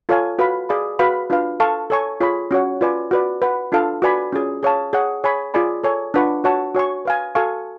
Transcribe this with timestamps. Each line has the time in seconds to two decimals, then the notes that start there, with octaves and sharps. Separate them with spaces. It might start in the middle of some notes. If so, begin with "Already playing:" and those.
0.09 F4 A4 C#5 F5 G#5
0.39 F#4 B4 F5 B5
0.69 G#4 D5 F5 B5
0.99 F#4 B4 F5 B5
1.30 D4 F4 B4 F5
1.60 A4 F5 A5 C#6
1.90 A4 C#5 G#5 C#6
2.20 F4 G#4 C#5 G#5 B5
2.51 C#4 F#4 C#5 F#5
2.81 F4 B4 D5 G#5
3.11 F#4 B4 D5
3.42 B4 F#5 B5
3.72 D4 F4 A4 F5 A5
4.02 F#4 B4 D5 G#5 B5
4.32 C#4 F4 G#4
4.63 G#4 C#5 F5 A5
4.93 G#4 C#5 F#5
5.24 G#4 C#5 G#5 B5
5.54 F4 G#4 D5 G#5 B5
5.84 A4 C#5 G#5
6.14 D4 F4 B4 F#5 C#6
6.44 F#4 C#5 F#5 A5 C#6
6.75 F#4 C#5 G#5 C#6
7.05 B4 F5 G#5
7.35 F#4 A4 F5 G#5 C#6